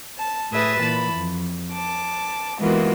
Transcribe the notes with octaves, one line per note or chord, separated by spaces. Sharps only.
A5
A2 G#4 B4 E5 D#6 A6
A#2 E3 A5 B5
F2
A5 D6
E3 G#3 A#3 B3 F4 F#4